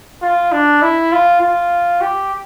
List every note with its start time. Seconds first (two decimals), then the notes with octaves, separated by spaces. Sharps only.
0.22 F4
0.52 D4
0.82 E4
1.12 F4
1.41 F4
2.01 G4